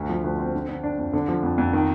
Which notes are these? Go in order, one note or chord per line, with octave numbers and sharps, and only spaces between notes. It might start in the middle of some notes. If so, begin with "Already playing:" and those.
Already playing: D2
F3
D2
C4
D3
D3
D4
F2
D3
F3
F2
F2
D#3